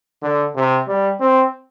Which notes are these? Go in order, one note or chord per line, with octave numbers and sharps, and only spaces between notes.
D3
C3
G3
C4